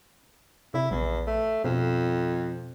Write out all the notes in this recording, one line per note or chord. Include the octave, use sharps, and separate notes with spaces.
C3 E4
A#1 E2
A3
F2 B2